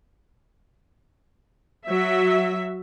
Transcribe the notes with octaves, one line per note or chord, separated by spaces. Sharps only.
F#3 E5